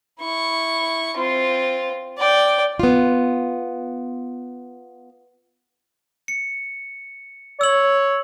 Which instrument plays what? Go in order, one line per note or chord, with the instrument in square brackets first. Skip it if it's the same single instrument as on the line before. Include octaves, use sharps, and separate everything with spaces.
[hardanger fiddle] E4 C#6
C4 F4
D5 G5
[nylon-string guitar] B3 F4
[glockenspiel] C#7
[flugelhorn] C#5 [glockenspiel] E6 F#7